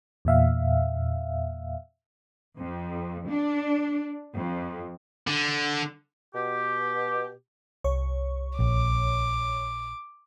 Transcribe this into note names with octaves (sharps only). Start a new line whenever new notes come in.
E2 A#2 E5 F5
F2
D4
F2
D3
B2 G4
C2 C#5 C#6
A#1 D6